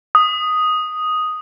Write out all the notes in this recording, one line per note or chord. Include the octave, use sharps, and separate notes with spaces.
D#6